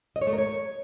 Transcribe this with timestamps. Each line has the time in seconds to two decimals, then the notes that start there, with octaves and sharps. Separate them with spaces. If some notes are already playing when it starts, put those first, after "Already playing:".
0.16 D#5
0.21 C#5
0.27 A3
0.33 A#4
0.38 C#5